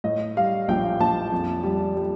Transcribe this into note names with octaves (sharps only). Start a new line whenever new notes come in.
A2 D#5
G3 F5
A#1 G5
A#1 A5
F2
G3
G3